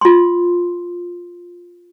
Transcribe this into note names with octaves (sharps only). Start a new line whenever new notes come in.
F4 C6